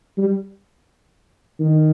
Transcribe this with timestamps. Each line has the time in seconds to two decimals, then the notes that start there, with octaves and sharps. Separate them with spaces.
0.18 G3
1.60 D#3